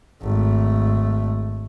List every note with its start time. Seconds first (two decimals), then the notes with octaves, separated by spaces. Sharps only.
0.23 G#1 A3